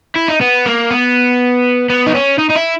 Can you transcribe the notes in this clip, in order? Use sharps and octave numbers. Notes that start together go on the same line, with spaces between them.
E4
D#4
B3
A#3
B3
B3
D#4
C#4
D#4
D#4
E4